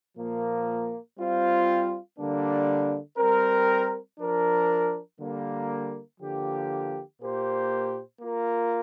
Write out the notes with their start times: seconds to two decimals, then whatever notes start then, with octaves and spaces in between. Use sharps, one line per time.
0.16 A#2 F3 A#3
1.17 G3 C4 F4 C5
2.18 D3 G3 A#3 D4
3.18 G3 C4 A#4
4.19 F3 D4 A#4
5.19 D3 G3 A#3
6.21 D3 F3 A#3 G4
7.21 A#2 A#3 G4 C5
8.21 A#3 F4 A#4